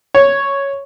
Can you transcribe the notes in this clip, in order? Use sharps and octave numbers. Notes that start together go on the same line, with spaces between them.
C#5